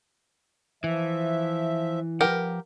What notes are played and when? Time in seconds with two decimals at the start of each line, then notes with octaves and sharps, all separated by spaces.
0.84 E3 F3 E5
2.21 F3 G4 A#4 B4 F#5